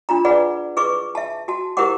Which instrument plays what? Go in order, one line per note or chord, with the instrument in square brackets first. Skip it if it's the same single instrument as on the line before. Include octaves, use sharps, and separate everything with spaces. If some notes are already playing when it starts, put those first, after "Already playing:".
[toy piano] D4 F4 A#5
G#4 B4 D5 F#5
G#4 B4 C#6 D6
E5 A5
F#4 A5
E4 G4 A#4 C5 F#5 D6